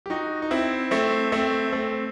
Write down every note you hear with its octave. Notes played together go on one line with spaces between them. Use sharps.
G4
D#4 F#4
D#4
C4 E4
A3 C4
A3 C4
A3 C4